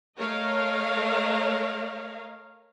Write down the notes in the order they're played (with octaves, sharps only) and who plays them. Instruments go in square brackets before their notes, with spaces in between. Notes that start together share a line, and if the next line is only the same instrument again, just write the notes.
[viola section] A3 A#4 C#5 D#5 F5